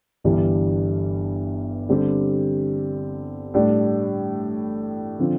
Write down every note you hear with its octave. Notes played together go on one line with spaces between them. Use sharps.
G1 G2 E3 G3 D4
D3 G3 C4 G4 D5
A2 G3 D4
D3 F3 C4